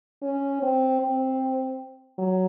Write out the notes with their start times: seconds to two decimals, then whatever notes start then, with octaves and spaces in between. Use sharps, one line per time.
0.22 C#4
0.62 C4
1.01 C4
2.18 F#3